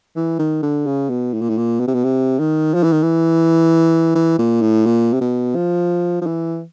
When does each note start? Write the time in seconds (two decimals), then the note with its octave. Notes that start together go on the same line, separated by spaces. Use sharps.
0.17 E3
0.39 D#3
0.63 D3
0.86 C#3
1.10 B2
1.34 A2
1.41 A#2
1.50 A2
1.58 A#2
1.80 B2
1.88 C3
1.94 B2
2.04 C3
2.39 D#3
2.74 F3
2.84 E3
2.92 D#3
3.03 E3
4.15 E3
4.39 A#2
4.62 A2
4.86 A#2
5.14 C3
5.21 B2
5.55 F3
6.22 F3
6.26 E3